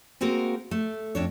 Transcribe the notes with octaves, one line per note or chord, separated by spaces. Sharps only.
G#3 A#3 C4 F#4 A#4
A3
F2 D4 C#5